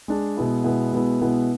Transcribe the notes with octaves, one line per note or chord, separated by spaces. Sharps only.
G#3 D4 G#4
B2 G#3 B3 E4
B2 G#3 B3 E4
B2 G#3 B3 E4
B2 G#3 B3 E4